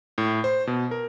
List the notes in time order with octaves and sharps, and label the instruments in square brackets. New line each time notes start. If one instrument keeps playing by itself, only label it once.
[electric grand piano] A2
C5
B2
A#4